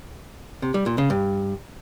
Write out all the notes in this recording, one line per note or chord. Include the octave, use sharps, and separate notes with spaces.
C3
G3
A#2
C#3
G2